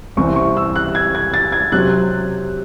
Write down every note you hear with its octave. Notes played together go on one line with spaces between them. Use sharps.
C2 C3 E3 C4 C#6
C#6
E6
F#6
G#6
G#6
A6
G#6
C3 F#3 C4 F#6